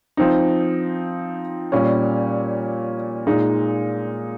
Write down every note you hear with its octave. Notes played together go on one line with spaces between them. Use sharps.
F3 C4 D#4
A#2 G3 C#4
A#2 G#3 D#4